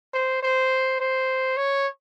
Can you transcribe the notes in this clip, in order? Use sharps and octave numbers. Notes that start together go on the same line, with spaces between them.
C5
C5
C5
C#5